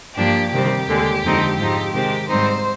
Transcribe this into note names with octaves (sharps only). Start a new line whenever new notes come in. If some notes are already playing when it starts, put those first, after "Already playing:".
G2 F3 A#3 D4 G4
C3 D#3 G3 C4 G4
D#2 D3 G#3
F2 D3 G#3 C4 D#4
G#2 F3 G#3 C4 D#4
C3 D#3 G#3 C4 G4
G#2 G3 C4 D#4 C5